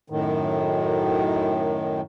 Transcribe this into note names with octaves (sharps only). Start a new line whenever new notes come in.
F#2 A2 D#3